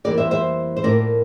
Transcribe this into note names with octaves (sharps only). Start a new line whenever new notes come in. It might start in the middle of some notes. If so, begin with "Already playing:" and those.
F2 E3 G3 A#3 A#4 D5
C5 E5
C5 E5
C5
A2 F3 A#3 A#4 D5